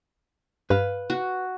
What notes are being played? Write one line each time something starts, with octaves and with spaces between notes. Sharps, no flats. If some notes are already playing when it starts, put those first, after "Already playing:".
G2 B4 F5
F#4